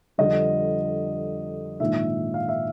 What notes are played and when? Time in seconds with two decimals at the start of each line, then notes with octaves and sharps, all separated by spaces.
0.18 F2 D3 G3 D#5
1.80 A#1 G#2 D#3 E5
2.34 F5
2.48 E5